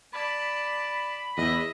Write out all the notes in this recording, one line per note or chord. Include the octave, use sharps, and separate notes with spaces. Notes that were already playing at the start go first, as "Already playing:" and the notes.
D5 A5 B5
E2 D#5 E5